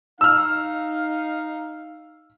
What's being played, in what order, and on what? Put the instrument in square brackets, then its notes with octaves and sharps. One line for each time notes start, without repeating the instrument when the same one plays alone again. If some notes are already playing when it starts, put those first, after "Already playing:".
[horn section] D#4 F5 [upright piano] E6 F6